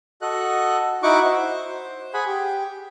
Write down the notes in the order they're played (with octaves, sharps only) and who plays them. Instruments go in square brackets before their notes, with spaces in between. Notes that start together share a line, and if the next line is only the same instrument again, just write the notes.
[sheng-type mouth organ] F#4 A4 D#5 F#6
D#4 E4 F#4 F#5 C#6 D6
C5
G#4 F#5 G#5 B5
G4